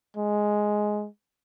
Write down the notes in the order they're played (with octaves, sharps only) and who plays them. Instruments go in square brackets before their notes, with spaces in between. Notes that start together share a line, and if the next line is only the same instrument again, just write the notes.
[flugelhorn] G#3